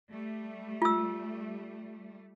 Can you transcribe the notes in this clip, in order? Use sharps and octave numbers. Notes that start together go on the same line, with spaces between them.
G3 A3
F4 E6